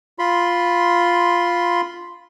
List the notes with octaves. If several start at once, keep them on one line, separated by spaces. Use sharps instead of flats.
F4 B5 C6